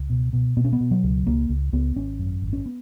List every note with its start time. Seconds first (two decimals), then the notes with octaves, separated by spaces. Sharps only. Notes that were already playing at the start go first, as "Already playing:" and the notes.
Already playing: C#2
0.10 B2
0.33 B2
0.57 B2 B3
0.65 C#4
0.73 B3
0.80 B2
0.91 F#3
1.03 C#2
1.27 C#2 A#3
1.49 C#2
1.73 C#2 B3
1.96 G#1 C#4
2.19 F#2
2.42 G#1
2.53 C#4
2.66 B3